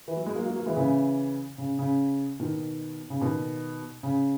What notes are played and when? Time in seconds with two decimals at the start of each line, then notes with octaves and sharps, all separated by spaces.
0.08 E3
0.17 F#3
0.26 G#3
0.35 F#3 A#3
0.45 F#3 A#3
0.56 F#3 A#3
0.66 E3 G#3
0.76 C#3 E3
1.58 C#3
1.79 C#3
2.40 B2 D#3
3.10 C#3
3.21 B2 D#3
4.03 C#3